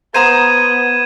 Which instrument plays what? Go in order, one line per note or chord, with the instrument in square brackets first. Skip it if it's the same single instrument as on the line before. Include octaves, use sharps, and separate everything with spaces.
[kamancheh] B3 [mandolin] C5 A#5 D#6 [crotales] G#6 D#7 E7